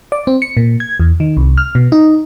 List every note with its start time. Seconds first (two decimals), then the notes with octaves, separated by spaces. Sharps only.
0.12 D5
0.27 C4
0.42 C#7
0.57 A#2
0.80 G#6
1.00 E2
1.20 D#3
1.37 C2
1.58 F6
1.75 B2
1.92 D#4